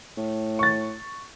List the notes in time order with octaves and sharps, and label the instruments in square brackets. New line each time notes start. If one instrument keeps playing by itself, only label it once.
[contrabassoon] A2
[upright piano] C#6 A6